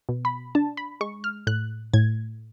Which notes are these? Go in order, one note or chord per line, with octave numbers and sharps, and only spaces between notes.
B2
B5
D4 A5
B5
G#3 C#6
F6
A2 F#6
A2 G#6